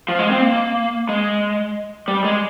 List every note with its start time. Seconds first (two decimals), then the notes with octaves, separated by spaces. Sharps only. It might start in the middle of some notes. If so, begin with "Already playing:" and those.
0.08 F3
0.19 G#3
0.31 C4
0.42 A#3
1.09 G#3
2.08 G3
2.24 G#3